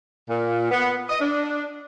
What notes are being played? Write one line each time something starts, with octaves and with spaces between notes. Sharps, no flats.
A#2
B3
D#5
D4